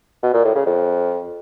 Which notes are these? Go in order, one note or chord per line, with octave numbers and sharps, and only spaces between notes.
B2
A#2
A2
C#3
F2